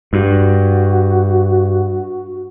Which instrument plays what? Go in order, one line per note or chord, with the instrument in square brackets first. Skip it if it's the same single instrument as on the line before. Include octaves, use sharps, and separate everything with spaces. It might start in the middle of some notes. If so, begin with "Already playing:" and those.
[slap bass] G2 [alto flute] F#4